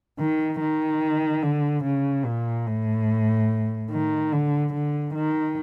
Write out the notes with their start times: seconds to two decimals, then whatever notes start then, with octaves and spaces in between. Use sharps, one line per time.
0.19 D#3
0.61 D#3
1.43 D3
1.84 C#3
2.25 A#2
2.67 A2
3.90 D#3
4.32 D3
4.73 D3
5.15 D#3